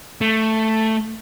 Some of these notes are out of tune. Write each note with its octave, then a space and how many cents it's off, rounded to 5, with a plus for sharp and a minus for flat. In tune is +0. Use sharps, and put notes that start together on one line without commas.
A3 +5